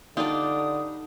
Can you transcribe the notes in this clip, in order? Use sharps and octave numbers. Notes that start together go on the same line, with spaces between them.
D3 G3 D4 D#4 F4 D5 D#6